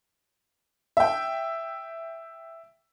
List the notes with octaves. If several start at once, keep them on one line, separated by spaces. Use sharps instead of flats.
E5 G5